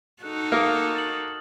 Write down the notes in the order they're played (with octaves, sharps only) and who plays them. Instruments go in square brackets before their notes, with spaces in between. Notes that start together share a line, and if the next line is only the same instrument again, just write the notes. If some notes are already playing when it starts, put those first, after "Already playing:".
[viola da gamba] D#4 F#4 A4 [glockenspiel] F#6
[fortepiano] A#3 [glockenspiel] D#6 F6
[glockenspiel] A6 F#7